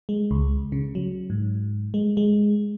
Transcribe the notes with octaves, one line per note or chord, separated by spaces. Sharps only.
G#3
C#2
C#3
F#3
G#2
G#3
G#3